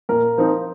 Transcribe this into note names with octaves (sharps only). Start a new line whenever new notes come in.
A#2 A#4
F3 C4 D#4